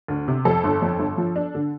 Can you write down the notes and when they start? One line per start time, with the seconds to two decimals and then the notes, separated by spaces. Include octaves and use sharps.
0.08 D2
0.28 C3
0.45 F2 A4
0.64 G1
0.82 F2
0.99 G1
1.18 F3
1.36 D4
1.55 D3